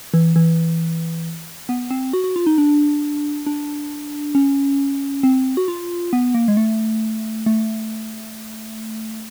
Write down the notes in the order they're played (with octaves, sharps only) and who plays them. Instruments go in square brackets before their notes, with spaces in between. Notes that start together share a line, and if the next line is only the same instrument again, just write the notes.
[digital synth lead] E3
E3
B3
C4
F#4
F#4
F4
D#4
D4
D4
C#4
C4
F#4
F4
B3
A#3
G#3
A3
A3